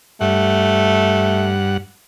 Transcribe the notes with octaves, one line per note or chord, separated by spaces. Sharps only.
G2 A3 F#5